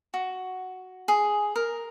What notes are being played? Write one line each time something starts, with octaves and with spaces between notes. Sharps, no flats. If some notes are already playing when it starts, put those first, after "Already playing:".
F#4
G#4
A#4